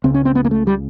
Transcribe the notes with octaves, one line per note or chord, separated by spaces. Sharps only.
C#2 C#3 C4
C#4
C4
B3
A#3
A3
G3